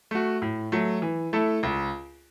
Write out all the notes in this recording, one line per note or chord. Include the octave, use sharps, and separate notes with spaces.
A3 F#4
A2
F#3 A3
E3
A3 E4 A4
C#2